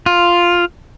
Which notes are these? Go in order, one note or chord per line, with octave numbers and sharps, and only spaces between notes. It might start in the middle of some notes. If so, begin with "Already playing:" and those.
F4